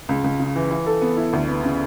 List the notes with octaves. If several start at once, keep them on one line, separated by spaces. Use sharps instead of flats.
C#2
C#2
C#3
E3
E3
A4
B3
E4
D2
B3
C#3